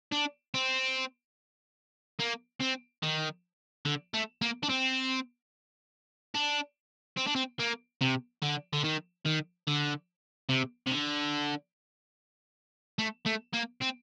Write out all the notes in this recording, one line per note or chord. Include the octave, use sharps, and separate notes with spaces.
D4
C4
A#3
C4
D#3
D3
A3
A#3
D4
C4
D4
C4
D4
C4
A#3
C3
D3
D3
D#3
D#3
D3
C3
C3
D3
A3
A3
A#3
C4